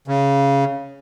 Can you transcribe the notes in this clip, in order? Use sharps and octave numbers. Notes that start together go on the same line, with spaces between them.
C#3